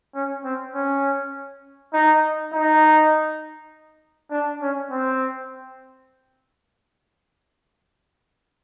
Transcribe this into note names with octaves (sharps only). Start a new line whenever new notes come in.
C#4
C4
C#4
D#4
D#4
D4
C#4
C4